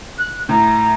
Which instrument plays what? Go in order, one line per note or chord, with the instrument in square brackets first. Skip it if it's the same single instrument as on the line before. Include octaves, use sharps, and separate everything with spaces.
[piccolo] F#6
[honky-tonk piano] A2 [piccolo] A#5